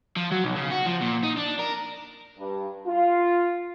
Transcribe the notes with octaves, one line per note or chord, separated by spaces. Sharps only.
F3
F#3
B1
C#3
F#4
F3
A#2
D#4
D4
A#4
G2
F4